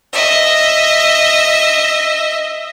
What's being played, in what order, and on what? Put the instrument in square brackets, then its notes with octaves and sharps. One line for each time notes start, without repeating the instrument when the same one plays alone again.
[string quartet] D#5 E5